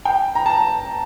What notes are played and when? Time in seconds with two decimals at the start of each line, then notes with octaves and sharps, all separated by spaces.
0.05 G5
0.35 A#5
0.46 A5